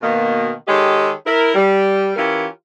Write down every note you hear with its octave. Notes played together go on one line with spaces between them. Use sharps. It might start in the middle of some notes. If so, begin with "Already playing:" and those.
B2 D#3 A#3
D#3 G#3 G4 A4 C#5 D#5
E4 A#4
G3
E3 C#4 E4 F4 G4 A#4